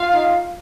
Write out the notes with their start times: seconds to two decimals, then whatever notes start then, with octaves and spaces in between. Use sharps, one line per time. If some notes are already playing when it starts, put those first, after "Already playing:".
Already playing: F4 F5
0.12 D#4